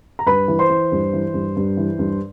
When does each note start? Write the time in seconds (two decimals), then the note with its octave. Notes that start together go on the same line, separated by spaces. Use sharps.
0.19 A#5
0.26 G2 B4 B5
0.48 E3
0.59 C5 C6
0.69 E3
0.92 G2
1.13 E3
1.34 G2
1.57 G2
1.77 E3
1.99 G2